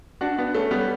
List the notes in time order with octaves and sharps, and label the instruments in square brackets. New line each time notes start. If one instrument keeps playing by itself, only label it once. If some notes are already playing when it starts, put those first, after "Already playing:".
[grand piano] D4 F#4
B3 D4
A3 C#4
G3 B3